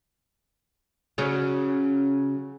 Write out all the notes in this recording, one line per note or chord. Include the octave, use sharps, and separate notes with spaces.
C#3 F#3 C#4